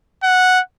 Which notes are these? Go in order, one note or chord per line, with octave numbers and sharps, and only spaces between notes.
F#5